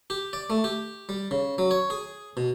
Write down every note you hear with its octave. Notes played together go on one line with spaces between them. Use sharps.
G4
D5
A3
G4
G3
C#3
F#3
C#5
G#4
B2